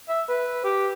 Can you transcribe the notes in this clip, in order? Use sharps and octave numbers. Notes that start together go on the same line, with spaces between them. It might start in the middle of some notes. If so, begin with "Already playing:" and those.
E5
B4
G4